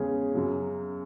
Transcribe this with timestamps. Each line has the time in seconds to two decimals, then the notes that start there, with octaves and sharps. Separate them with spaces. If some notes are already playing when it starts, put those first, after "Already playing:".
Already playing: E2 C#3 G#3 C#4 G#4
0.34 F#2 C#3 F#3